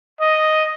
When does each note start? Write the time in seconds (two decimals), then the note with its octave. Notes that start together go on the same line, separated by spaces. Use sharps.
0.20 D#5